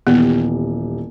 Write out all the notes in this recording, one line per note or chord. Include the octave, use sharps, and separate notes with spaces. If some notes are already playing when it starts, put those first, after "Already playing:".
D#1 E3 B3 G4